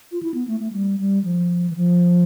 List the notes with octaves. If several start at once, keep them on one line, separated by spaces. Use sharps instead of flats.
F4
E4
B3
A3
A3
G3
G3
F3
E3
F3